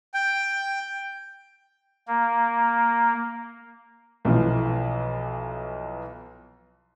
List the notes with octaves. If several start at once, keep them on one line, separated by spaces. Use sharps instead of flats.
G5
A#3
B1 E3 F3